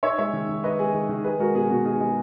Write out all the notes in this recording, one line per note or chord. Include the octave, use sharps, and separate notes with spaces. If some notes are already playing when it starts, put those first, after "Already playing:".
D#4 C#5 E5
G#3 C#5 E5
D#3
D#3
D#4 B4 D#5
G#3 G#4
D#3
D#3
D#4 G#4 B4
G#3 F#4 A#4
B2 G#4
B2 F#4
D#4 G#4
G#3 G#4